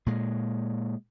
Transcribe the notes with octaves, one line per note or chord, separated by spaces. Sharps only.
A#2 G#3